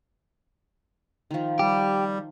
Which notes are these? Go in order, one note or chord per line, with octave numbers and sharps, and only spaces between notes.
D#3 F3
G3 G4